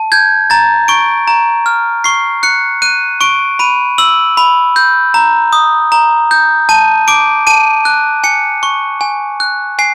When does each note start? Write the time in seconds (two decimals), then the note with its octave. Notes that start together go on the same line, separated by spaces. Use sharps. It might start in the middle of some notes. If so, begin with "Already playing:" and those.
Already playing: A5
0.12 G6 G#6
0.50 A#5 A6
0.88 C#6 D7
1.28 A#5
1.66 F6
2.04 C#6 C7
2.43 F#6 C#7
2.82 F#6 D#7
3.21 C#6 D7
3.59 B5 D#7
3.98 E6 F#7
4.37 B5
4.76 G6
5.14 A#5
5.53 D#6
5.92 A#5
6.31 G6
6.69 A5 D#7
7.08 D6 D7
7.47 A5 D#7
7.85 F#6
8.24 G#5 C#7
8.63 C#6
9.01 G#5
9.40 F#6
9.79 G#5 C7